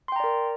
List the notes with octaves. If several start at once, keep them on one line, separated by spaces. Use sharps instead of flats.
A#4 D5 G5 A#5 C6